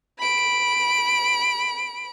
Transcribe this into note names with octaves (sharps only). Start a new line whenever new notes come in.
B5 D7